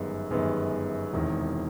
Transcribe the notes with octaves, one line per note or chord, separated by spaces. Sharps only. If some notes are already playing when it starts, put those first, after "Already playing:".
Already playing: G1 F#2 D#3 G#3 B3
G1 F#2 D#3 G#3 B3
E1 E2 C3 D#3